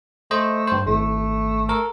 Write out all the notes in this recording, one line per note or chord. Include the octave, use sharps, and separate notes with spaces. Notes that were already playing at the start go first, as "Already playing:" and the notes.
A3 C5 D#5
G2 C5
G#1 A3
A4 A#4